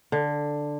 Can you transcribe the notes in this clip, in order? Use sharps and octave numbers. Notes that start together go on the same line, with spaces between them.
D3